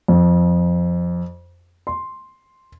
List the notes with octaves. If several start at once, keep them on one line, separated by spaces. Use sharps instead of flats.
F2
C6